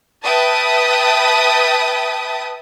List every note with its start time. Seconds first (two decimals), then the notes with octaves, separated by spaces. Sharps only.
0.24 B4 E5 G5 A5 D#6